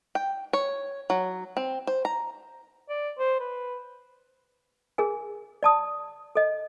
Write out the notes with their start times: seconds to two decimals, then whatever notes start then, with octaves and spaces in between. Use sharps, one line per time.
0.15 G5
0.53 C#5
1.10 F#3
1.57 C4
1.87 C5
2.05 A#5
2.89 D5
3.19 C5
3.40 B4
4.98 G#4 A#4 G#5
5.63 D5 A5 D#6
6.35 A4 D#5